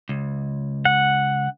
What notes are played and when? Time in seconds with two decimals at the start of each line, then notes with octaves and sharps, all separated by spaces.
0.09 C#2
0.85 F#5